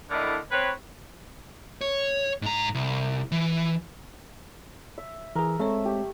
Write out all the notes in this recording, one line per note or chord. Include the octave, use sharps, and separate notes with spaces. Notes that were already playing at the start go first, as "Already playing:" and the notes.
A2 D3 E4 A#4 D5 D#5
C4 B4 C#5
C#5
G#2 A#5
C2
E3
E5
E3 G#4 A#4
G#3 A3 C4 C#5 E5
G4